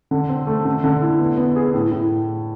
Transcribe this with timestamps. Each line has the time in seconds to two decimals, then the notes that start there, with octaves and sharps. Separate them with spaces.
0.11 D3
0.29 C4
0.47 A3
0.65 D3
0.84 D3
1.02 E4
1.19 B3
1.37 B3
1.56 G#4
1.74 A2
1.91 A2